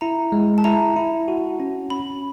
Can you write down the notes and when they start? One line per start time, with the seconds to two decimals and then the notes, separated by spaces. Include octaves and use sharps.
0.01 E4 A#5
0.32 G#3
0.58 A5
0.64 E4 A#5
0.96 E4
1.28 F#4
1.60 C#4
1.90 C#4 B5